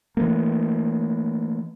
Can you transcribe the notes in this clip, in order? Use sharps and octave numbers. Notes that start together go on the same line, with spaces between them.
E3 F#3 A3 A#3